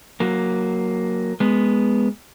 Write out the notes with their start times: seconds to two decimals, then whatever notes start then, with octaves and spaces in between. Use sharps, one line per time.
0.20 F#3 A#3
1.40 G#3 B3